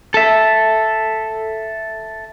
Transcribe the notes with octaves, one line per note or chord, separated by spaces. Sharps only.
A4 E5